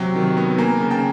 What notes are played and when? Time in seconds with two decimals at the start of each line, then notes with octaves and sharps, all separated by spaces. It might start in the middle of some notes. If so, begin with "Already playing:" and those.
Already playing: C3 F#3 G5
0.16 D#3
0.37 B3
0.58 A#3 G#5 A#5
0.80 C#3
0.91 G5 A5